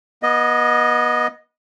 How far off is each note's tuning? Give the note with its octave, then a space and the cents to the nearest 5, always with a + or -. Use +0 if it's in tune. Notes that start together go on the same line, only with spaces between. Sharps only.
B3 -25 D#5 +0